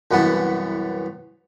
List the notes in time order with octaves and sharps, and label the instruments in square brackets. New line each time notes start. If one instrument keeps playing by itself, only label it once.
[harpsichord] C2 F#2 E3 B3 F#5 A5